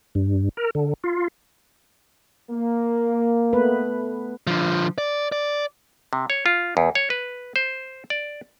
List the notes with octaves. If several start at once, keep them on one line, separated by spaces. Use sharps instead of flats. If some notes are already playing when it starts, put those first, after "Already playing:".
G2
A#4
D3
F4
A#3
A3 B3 B4
D3 F3
D5
D5
C3
C#5
F4
E2
C#5
B4
C5
D5